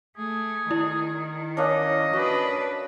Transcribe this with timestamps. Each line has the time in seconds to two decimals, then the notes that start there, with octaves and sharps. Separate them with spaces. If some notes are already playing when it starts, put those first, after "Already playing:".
0.17 A3 G#4
0.71 D#3 E4
1.57 A#3 C#4 D4 D#5
2.13 D4 F#4 B4